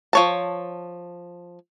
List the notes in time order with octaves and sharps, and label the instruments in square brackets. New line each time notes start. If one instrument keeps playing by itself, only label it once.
[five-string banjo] F3 C#5 A5